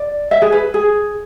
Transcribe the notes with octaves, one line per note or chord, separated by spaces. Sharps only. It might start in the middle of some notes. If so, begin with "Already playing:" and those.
Already playing: D5
E5
G#4
B4
G#4